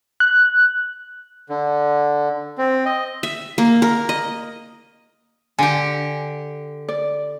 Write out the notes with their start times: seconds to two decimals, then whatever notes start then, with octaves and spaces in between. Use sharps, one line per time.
0.20 F#6
1.49 D3
2.58 C4
2.86 D#5
3.23 E5
3.58 A#3
3.82 A#4
4.09 D#5
5.59 D3 G4 G#5
6.89 D5